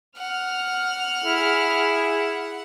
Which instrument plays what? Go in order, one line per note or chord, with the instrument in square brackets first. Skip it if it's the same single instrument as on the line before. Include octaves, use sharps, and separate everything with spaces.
[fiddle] F#5 [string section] F6
[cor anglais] E4 [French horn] G#4